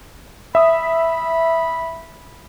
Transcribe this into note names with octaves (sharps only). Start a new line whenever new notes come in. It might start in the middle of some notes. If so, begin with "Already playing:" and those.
E5 B5 D#6